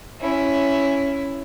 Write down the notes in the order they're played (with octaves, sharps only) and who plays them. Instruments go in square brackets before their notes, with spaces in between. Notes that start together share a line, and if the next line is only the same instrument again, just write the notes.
[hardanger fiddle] C#4 E4